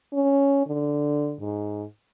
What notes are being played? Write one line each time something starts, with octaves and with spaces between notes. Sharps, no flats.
C#4
D3
G#2